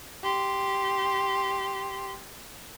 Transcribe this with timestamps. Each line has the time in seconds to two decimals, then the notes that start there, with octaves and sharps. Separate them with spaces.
0.24 G4 C6